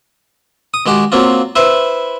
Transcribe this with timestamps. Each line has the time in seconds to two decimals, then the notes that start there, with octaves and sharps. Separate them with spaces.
0.74 D#6
0.86 D#3 G#3 F#4 G4
1.12 F#3 A#3 C4 F4
1.56 E4 B4 C5 E5